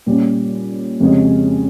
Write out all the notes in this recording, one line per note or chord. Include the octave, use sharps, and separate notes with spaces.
A#2 G3 C#4
F2 C#3 G#3 C#4 G4